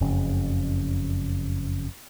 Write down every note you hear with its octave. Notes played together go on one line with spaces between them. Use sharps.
F#1 F2 C#3